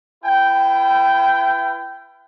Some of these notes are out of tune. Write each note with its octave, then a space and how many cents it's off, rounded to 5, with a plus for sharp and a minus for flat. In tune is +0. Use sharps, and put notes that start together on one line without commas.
E4 +35 B4 +0 G5 -10